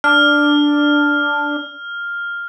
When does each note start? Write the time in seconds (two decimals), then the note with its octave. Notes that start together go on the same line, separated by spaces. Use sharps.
0.04 D4 F6